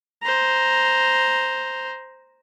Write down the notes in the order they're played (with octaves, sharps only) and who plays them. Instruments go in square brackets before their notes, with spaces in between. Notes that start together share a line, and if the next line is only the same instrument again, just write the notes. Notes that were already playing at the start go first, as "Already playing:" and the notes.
[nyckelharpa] C5 A#5